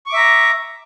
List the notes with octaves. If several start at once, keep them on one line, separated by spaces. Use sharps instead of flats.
E5 A#5 C#6 D6